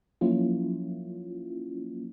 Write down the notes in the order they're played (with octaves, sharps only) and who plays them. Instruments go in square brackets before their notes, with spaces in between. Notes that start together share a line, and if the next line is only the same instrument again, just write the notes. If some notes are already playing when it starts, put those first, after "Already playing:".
[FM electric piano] F3 F#3 A#3 C#4 E4 F4